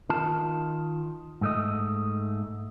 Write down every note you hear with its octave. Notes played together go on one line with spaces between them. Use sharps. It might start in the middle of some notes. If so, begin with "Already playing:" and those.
D#3 F4 A5
G#2 A3 D#5